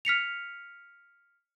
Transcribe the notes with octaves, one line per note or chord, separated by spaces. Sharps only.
F6 B6 C#7 F7